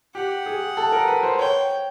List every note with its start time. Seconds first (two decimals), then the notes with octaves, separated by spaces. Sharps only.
0.15 G4 F#5
0.46 G#4
0.77 A4
0.92 A#4
1.08 B4
1.23 C5
1.39 C#5 G5